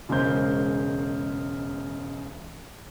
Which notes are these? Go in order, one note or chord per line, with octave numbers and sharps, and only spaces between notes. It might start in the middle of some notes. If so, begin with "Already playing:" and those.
E1 C#3 G#3 A#4 C5 G6